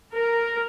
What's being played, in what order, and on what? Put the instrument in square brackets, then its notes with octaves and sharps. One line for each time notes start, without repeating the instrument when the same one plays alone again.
[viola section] A#4